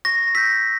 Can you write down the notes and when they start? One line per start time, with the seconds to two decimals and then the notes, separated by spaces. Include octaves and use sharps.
0.05 C#6 A#6
0.35 E6 G6 B6